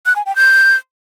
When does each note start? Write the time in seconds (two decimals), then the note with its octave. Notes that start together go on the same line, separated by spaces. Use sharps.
0.06 F#6
0.16 G#5
0.26 G5
0.36 G6